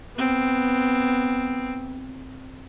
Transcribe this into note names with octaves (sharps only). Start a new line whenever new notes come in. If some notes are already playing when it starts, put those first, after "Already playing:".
B3 C4